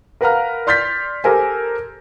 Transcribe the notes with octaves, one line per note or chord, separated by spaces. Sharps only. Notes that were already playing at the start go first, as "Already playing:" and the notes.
A#4 B4 F5 F#5 A#5 F6
D5 C6 F6 G6 A6 B6
G4 A4 A#4 C5 G#5